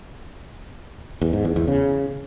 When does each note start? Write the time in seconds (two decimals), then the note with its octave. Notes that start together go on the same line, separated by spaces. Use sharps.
1.22 E2
1.33 G#2
1.45 E2
1.56 E2
1.68 C#3